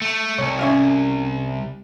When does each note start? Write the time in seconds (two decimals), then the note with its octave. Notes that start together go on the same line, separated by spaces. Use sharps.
0.02 A3
0.38 C2 C#5
0.59 C#4 E5 F5